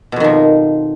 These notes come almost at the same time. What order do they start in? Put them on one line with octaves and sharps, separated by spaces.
B2 F2 D#3 F3